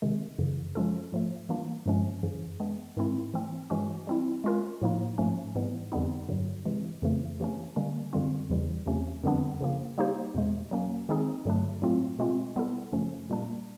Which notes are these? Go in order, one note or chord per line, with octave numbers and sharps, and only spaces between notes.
C3 D#3 G#3
F#2 C#3 E3
F3 G#3 C#4 F4 A4
G#2 F3 A3
E3 G3 A#3 D4 F4
G2 D3 F3 G#3 C#4
F#2 C#3 E3
G#3 B3 D4
G#2 D#3 G#3 C4 E4
E3 A3 C4
G2 E3 G#3 C#4 F#4
G3 C4 E4
G#3 C#4 F4 A#4
A2 F3 A#3 D#4
G#2 F3 A3 C#4
G#2 E3 G3 B3
F2 D3 G3 B3 D#4
G2 D3 F#3
C3 E3 G#3
F2 C#3 E3 A3
C3 E3 A3 C#4
D3 G3 A#3 C#4
F#2 D3 G3 C4 F4
E2 C#3 E3 G3
E2 C3 F3 A3 C#4
F2 D3 G3 B3 D4
C#3 F3 A#3
G3 A#3 D#4 G4 C5
E2 B2 G#3
F#3 A#3 C#4
D#3 G#3 C4 D#4 G#4
G2 D3 F#3 A3 D4
A2 F#3 A3 C4 F4
B2 G#3 C4 F4
G3 B3 E4 A4
F#2 C#3 F3 A3 C#4
A#2 G3 A#3 D4